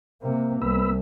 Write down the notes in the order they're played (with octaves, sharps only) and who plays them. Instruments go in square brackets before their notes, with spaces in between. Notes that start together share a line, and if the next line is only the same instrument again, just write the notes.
[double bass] C3 A#3
[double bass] C2 [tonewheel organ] B3 B5 E6